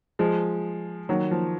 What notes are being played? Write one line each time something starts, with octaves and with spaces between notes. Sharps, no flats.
F3 G#3
D#3 F#3
F3